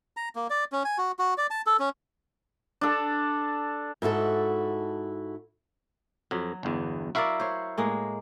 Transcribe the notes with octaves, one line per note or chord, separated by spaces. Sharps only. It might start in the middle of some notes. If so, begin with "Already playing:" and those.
A#5
A#3
D5
C#4
G#5
F#4
F#4
D5
A5
A4
C#4
D4 A4
G#2 E4 F#4 A4
F2 F#3
G1 E2
E4 F#4 A#4 D5 E5 F5
C5 C#5
A2 G#3 A#3